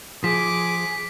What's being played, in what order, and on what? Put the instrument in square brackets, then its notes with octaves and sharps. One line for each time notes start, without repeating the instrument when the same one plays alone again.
[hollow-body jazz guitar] F3 [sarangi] G#4 [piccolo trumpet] D6 [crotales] B6